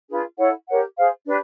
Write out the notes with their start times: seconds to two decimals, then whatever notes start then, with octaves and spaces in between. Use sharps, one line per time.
0.09 D4 F4 G#4 B4
0.38 E4 A4 C#5 F#5
0.67 G4 A#4 C#5 F#5
0.96 G#4 C5 F5
1.26 D4 G4 B4